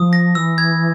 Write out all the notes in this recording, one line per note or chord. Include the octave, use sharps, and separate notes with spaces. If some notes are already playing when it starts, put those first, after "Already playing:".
Already playing: F3 D#6
A#6
E3 E6
G#6